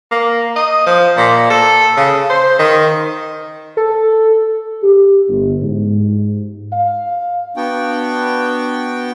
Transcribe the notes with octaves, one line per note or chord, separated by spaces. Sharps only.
A#3
D#5
F3
A#2
A4
C#3
C5
D#3
A4
G4
G1
G#2
F5
B3 D4 F#4 G5